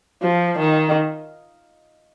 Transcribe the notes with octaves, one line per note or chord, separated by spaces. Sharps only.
F3
D#3